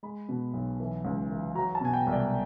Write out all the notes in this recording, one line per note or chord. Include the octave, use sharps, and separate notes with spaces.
G#3 B5
B2
B1
E3
C#2
E3
F#3 A#5
A5
B2 G#5
G5
C2
D5